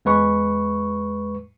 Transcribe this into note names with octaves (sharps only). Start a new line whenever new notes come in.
E2 G#3 B4 C#6